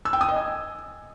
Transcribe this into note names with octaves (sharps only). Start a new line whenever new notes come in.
E6
G5
D#6
D#5
G#5